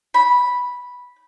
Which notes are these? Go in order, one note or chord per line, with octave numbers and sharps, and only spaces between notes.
B5